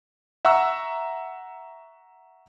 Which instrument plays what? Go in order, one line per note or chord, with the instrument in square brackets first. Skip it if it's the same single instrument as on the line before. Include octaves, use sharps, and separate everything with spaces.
[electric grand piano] E5 F#5 A#5 C#6 E6